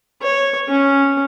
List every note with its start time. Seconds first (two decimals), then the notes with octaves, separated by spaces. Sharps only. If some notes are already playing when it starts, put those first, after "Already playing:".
0.22 C#5
0.69 C#4